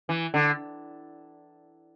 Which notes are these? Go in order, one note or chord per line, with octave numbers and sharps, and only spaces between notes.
E3
D3